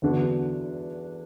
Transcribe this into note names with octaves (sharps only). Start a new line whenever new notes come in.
E2 D3 B3 D4 F#4